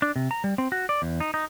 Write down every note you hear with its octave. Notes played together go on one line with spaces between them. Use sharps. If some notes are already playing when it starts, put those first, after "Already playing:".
D4
C3
A#5
G3
C4
F#4
D5
E2
D#4
D#4